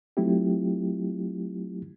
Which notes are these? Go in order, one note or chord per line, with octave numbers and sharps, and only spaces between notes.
F#3 A3 C4 E4 F4 G4